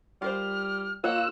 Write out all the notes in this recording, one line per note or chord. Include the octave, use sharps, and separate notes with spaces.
G3 F4 A#4 C5 F6
A#3 F4 C#5 D#5 F#5 E6 F#6